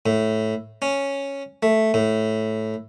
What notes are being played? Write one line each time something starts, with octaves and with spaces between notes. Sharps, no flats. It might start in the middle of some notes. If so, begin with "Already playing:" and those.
A2
C#4
A3
A2